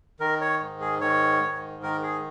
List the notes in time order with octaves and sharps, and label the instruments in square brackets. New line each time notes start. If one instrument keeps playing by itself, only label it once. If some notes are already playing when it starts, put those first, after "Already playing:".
[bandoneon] D#3 A#4
C#5
G#2
G#4
D#3 C#5
G#2
D#3 A#4
G#4